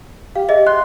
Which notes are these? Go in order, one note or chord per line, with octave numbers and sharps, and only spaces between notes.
G4 F5
G#4 D#5 E5
C6 F#6